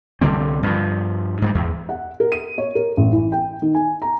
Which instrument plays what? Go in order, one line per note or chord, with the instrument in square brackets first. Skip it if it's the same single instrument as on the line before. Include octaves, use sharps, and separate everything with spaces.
[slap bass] C2 D3 G3 C4
G2 F3
G#2 F#3 G3
E2
[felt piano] F#5
A#4
D#7
C#5
A#4
A1
E3
G5
D#3
G#5
A#5